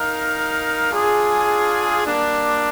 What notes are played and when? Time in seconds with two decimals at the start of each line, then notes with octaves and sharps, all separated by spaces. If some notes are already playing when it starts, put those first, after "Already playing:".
Already playing: D#4 A#4 F5
0.92 D4 F4 G#4
2.06 G3 A#3 D4